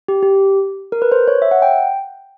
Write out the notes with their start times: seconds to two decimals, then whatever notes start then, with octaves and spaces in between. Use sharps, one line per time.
0.08 G4
0.23 G4
0.92 A#4
1.02 B4
1.12 C5
1.28 C#5
1.42 E5
1.51 F#5
1.62 G5